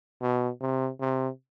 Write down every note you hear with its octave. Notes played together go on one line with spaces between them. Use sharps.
B2
C3
C3